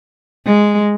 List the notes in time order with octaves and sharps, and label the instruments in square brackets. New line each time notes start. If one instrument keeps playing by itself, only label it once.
[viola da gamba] G#3